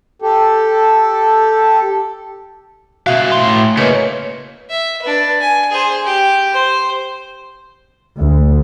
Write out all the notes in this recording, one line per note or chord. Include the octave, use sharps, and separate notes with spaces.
G4 A4
B2 F#4 E5 F5
A2 C6
C#3 A#3 B4 C#5 D#5
E5
D4 B4
G#5
G#4 C5
G4
C5
D2